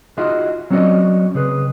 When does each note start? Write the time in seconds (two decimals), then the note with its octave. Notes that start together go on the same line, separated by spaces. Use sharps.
0.17 D#4 F4 F#4 G#4 D#5 E5
0.70 F#3 C4 C#4 F#4 D5 D#5
1.35 C#3 G#4 B4